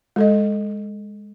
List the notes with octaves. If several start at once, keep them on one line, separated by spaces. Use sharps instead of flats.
G#3 A4 D#5